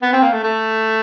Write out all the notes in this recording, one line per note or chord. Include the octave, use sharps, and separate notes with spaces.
B3
C4
A#3
A3
A3